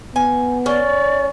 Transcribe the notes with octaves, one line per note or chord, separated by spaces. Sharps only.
B3 G#5
C#4 D5